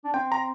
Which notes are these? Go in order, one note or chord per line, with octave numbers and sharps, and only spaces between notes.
D4
C4 G5
A#5